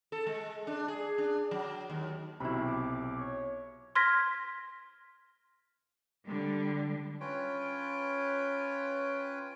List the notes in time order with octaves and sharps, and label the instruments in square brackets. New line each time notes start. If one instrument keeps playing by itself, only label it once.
[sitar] A4
G#3
D4
G#4
D4
F#3
D#2
[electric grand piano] B1 C3 [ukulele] E4 B5 [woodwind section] F#4
[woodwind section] D6
C#5
[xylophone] C6 F6 G#6 A#6 B6
[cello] D3 G3
[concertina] C#4 F4 B4 C#5 G5